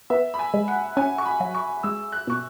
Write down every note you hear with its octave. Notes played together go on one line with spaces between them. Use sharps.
B3 E5
B5
G#5
G#3
F#5
C#4 G#5
C#6
B5
F#3
C#6
G#3 E6
F#6
B2 C#6